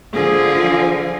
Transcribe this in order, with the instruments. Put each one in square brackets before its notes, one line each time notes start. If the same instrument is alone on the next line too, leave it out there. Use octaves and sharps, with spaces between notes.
[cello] D3 F3 [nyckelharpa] G#4